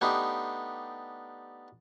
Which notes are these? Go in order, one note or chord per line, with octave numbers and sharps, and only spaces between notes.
A3 B3 D4 D#4 G4